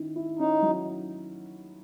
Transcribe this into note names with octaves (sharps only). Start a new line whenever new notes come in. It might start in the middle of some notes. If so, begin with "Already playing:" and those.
Already playing: D#3 C#4 E4
E4
C#4 D#4
F#3